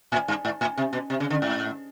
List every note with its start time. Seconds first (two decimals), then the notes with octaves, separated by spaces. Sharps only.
0.12 A2
0.28 G2
0.45 G#2
0.61 A2
0.77 C3
0.93 B2
1.10 C3
1.20 C#3
1.30 D3
1.42 G#2